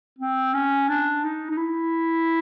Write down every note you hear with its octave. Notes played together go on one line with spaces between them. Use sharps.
C4
C#4
D4
D#4
D#4
E4